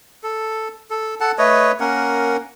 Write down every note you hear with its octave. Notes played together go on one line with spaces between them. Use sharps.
A4
A4
A4 F#5 A5
A3 B4 C#5 D#5
A#3 C#4 A#4 F#5